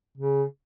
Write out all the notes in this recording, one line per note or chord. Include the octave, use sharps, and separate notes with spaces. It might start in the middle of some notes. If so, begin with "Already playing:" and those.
C#3